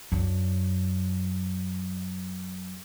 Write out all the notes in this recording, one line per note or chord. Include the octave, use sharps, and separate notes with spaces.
F#2 D4